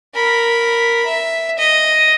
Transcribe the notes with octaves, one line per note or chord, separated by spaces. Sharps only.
A#4 B5
E5
D#5